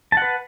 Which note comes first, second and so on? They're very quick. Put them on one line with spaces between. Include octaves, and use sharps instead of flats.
A5 F#5 B4